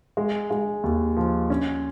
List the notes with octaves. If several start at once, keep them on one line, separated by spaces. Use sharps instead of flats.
G#3
G#3
D#2
F3
C#4